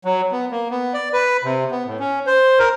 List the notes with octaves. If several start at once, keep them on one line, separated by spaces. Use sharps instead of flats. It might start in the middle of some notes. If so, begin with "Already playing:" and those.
F#3
B3
A#3
B3
D5
B4
C3
B3
A2
C#4
C5
A#4